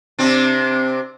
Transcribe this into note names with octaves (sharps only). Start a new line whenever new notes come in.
C3 C4 D4